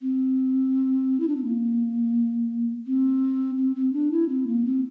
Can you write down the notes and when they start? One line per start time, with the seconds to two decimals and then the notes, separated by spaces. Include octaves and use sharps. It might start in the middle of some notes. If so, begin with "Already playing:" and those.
0.02 C4
1.20 E4
1.28 D4
1.36 C4
1.44 A#3
2.87 C4
3.58 C4
3.76 C4
3.93 D4
4.11 E4
4.29 C4
4.47 A#3
4.65 C4